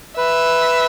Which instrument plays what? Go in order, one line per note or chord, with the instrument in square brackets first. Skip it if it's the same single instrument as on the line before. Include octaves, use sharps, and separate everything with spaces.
[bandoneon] B4 [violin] E5